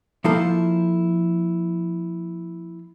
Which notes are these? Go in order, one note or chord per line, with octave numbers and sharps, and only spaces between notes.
F3 A#3 E4 F4 A4 C5